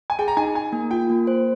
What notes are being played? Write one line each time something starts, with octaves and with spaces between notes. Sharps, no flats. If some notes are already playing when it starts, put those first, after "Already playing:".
G#5
G#4 G5
A#5
D#4 G#5
D#4 G#5
A#3
F4 G5
A#3
C5